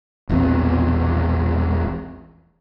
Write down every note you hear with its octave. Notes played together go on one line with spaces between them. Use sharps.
E1 A#1 E2 C4